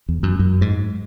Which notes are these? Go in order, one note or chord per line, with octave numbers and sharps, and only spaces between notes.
E2
F#2
F#2
G#2